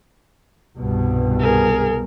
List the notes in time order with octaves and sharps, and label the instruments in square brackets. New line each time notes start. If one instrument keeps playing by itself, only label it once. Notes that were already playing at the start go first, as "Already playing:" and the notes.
[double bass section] C2 G2 B2
[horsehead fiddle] G#4 A#4